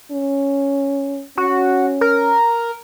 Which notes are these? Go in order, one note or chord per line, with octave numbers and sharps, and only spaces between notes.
C#4
C#4 F#4
A#4